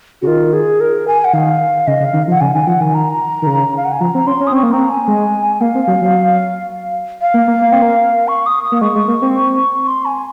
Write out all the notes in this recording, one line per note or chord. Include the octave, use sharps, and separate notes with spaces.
C#3 F#4
D#3 F4
G#4
A#4
G#5
F#5
D#3 F5
C#3 D#5
C#3
F5
D#3
F3
F#5
C#3 G#5
D#3 G#5
F3 F#5
D#3 G#5
A#5
D#3
C#3
F5
F#5
G#5
F3 A#5
C4
C#4 C6
C#4
D#6
C4 C#6
A#3
C4 A#5
G#5
G#3
A#3 F5
C4
F#3
F#3
F5
A#3
A#3
A#3
C4
A#3
C#6
D#6
D#6
A#3
G#3 C#6
G#3
A#3
C4
C6
G#5